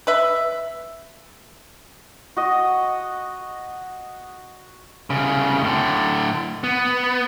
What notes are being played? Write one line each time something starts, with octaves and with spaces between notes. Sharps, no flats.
B4 E5
F#4 D#5
C2 C#3
A2 D3
B3